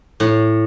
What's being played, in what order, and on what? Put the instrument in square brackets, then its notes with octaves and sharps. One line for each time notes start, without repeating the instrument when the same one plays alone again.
[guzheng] A2